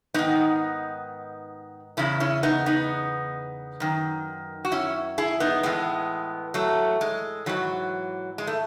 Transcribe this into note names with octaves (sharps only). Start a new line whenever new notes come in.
G#2 D#3 B3 D#4
E2 C#3 C#4 E4
C#4 E4
B3 D#4
B3 D#4
F#2 D#3
F#4
C#4 E4
E4 G#4
B3 D#4
A2 E3 G#3 B3
F#3 A3
G#3
G#2 E3 F#3
G#3
A3